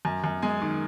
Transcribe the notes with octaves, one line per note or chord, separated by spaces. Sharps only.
F#2
F#2
G#3 G#5
D#3